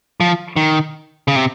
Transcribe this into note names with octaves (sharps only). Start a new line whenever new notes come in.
F3
D#3
C#3
C3